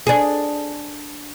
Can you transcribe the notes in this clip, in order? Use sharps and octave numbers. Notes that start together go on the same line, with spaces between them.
D4 G#4